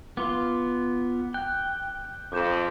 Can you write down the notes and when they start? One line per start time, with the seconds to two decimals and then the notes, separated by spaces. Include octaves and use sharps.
0.17 B3 F4 C6 D6
1.34 G5 F#6
2.32 F2 D6 G6 E7